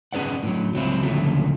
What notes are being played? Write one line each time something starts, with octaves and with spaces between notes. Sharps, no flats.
C#4 G#4 B4 D5 F#5
A2 F#3
C#2 F#3 C4 E4 F4
D2 A#2 C#3 F3 F#3 A3